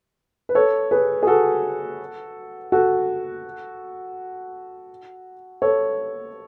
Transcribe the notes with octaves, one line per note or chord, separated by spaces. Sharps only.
B4
A4 C#5
G#4 B4
G#4
F#4 A4
F#4 A4
A4 C#5